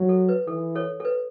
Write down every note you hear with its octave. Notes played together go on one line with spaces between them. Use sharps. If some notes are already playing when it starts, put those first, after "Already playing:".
Already playing: F#3
A4
B4
E3 A4
A4 C#5
A4
B4